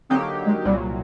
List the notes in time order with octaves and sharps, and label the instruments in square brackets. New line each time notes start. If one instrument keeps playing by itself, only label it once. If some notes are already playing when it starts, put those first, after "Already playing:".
[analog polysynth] D3 F#3 A#3 D#4 G4 [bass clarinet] C4
[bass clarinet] G#3
[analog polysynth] C2 A#2 F#3 [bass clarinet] G3